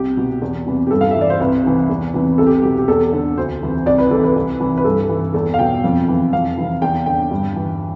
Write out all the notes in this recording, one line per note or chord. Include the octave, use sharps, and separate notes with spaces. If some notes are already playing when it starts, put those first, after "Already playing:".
Already playing: C2 G4
B2
E2
C3 E3
G4
G2 A4
F5
E3 E5
D5
C5
C2 B4
C3 E3
E2
C3 E3
C2 A4
G4
B2 G4
G4
E2 A4
D3
D2 C5
C3 E3
C2 D5
B4
C3 E3 A4
B4
C2
C3 E3
B4
G2 A4
E3
E2 A4
F5
B2 G5
F2
E3
F2 F5
C3 E3
E2 G5
D3 G5
G2
E3